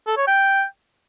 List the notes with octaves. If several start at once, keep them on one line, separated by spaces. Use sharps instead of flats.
A4
C#5
G5